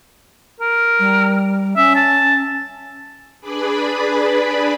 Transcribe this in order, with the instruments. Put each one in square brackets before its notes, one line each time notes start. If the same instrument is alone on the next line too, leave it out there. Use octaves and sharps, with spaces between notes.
[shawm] A#4
[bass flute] G3
[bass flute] C#4 [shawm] E5
[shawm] A5
[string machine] D4 G#4 B4 D5 B5